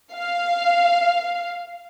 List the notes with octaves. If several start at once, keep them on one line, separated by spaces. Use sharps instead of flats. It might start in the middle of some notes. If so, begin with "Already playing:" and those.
F5